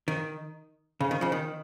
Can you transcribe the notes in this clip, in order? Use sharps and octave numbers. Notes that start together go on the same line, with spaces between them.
D#3
C#3
D#3
C#3 F3
D#3